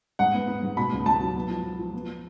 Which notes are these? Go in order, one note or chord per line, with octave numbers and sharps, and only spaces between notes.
G#2 F#5
B3
B3
G#2
B2 B5
C#2
C#2 A5
F#3
B3
F3
F3
F3
B3